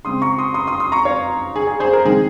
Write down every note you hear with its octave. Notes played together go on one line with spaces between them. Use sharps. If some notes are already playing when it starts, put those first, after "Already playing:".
C#3 G#3 C4 C6 D#6
A#5 C#6
C6 D#6
C6 D#6
C6 D#6
C6 D#6
A#5 C#6
C#5 F5
G#4
G#4
G#4 C5
A#4
D#3 G#3 C4 G#4